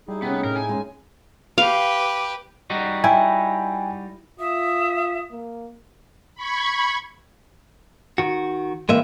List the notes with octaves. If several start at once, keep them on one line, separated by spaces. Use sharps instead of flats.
G3 D#4 E4 G#4
C3 A3 B3 C#4
A2 A#4
G#5
G#3 C#4
G4 B4 F5
G3 D#4 F#4
E4 G5 G#5
F4 E5 D#6
A#3
B5 C#6 G#6
D#3 F#4
E3 G#3 A#3 C4 D#5 E5